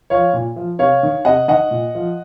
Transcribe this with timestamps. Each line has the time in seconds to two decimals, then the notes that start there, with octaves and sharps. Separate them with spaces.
0.10 F3 C#5 F5
0.34 A#2
0.56 F3
0.79 C3 C#5 F5
1.03 D#3
1.25 C3 D#5 F#5
1.48 D#3 D#5 F#5
1.71 A#2
1.95 F3